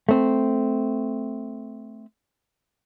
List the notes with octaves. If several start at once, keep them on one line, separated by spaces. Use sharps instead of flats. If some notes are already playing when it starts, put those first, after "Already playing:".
A3 C4